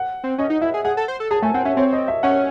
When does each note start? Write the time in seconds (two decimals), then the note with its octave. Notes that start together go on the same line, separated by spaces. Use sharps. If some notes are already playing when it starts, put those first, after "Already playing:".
Already playing: F#5
0.24 C4
0.38 C#4 D#5
0.50 D#4
0.61 E4 E5
0.74 G#4
0.84 G#4 F#5
0.97 A4
1.08 C5
1.20 A4
1.30 G#4 A5
1.42 A3 G#5
1.54 C4 F#5
1.65 C#4 E5
1.77 C4 C#5
1.93 D#5
2.08 E5
2.23 C#4 F#5